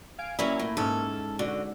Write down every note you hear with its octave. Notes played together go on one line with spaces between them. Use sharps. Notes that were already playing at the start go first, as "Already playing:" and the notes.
F5 G#5 D7
D2 F#3 A#3 C#4 E4
A2
G#2 C#4 A4
D3 F#4